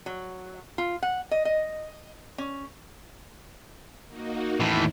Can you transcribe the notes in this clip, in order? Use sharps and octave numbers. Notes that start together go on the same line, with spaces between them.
F#3
F4
F#5
D#5
D#5
C#4
A#3 D#4 F#4
E2 A2 D#3 E3 E4